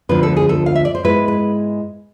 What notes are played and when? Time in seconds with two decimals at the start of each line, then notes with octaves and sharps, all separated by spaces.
0.09 D2 D3 F3 B3 F4 B4
0.23 A4
0.37 G#4
0.49 A4
0.66 F5
0.75 E5
0.85 D5
0.95 C5
1.03 G#2 G#3 B3 E4 B4
1.28 B4